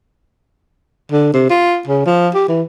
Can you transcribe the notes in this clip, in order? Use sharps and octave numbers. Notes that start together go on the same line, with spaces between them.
D3
C3
F4
C#3
F3
G4
E3